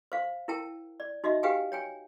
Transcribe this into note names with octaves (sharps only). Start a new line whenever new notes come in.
C5 F5
E4 A#4 G5 A5
D5
D#4 F#4 D#5 E5
G4 B4 F5 G5 G#5
C#5 G5 G#5